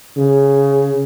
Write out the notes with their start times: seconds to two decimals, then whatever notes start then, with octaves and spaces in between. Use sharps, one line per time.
0.17 C#3